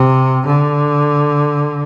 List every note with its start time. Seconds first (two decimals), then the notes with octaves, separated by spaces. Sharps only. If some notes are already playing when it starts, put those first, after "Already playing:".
Already playing: C3
0.46 D3